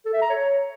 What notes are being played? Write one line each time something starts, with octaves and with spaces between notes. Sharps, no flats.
A4
E5
A#5
C#5